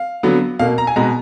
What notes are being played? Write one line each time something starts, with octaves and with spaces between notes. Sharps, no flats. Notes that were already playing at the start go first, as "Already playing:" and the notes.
Already playing: F5
D3 F#3 B3
B2 A#3 F5
A#5
G#5
B2 G#3 B3 A#5